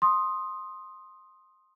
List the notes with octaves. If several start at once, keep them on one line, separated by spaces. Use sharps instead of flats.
C6 D#6